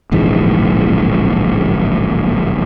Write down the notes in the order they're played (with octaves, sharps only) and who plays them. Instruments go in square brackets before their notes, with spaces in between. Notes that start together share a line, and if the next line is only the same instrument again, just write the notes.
[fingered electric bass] D1 A#1 G#2 E3